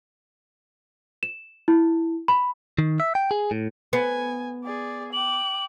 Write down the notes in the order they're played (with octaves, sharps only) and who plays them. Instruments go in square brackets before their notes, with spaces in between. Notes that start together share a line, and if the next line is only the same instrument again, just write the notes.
[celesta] E7
E4
B5
[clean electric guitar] D#3
E5
G5
G#4
A2
[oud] B3 [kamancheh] G#5
[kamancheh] G#4 D5
[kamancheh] G5 D6 [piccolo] F#7